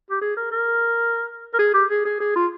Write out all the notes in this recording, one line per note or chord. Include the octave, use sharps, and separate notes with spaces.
G4
G#4
A#4
A#4
A#4
G#4
G4
G#4
G#4
G#4
F4